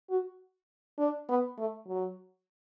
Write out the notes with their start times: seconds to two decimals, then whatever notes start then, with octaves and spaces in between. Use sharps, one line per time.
0.10 F#4
0.99 D4
1.29 B3
1.58 A3
1.87 F#3